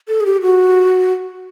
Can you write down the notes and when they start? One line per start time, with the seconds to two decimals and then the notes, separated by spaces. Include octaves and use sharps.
0.08 A4
0.20 G#4
0.26 G4
0.42 F#4